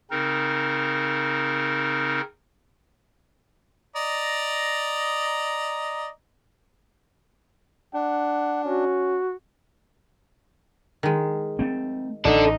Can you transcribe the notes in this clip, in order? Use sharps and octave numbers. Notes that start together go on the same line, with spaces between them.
C#3 C4 D#4 A#4
D5 D#5 A#5
D4 F#5
C#4 F#4
D#3 G#3
A3 C4
A1 D#4 A4 D5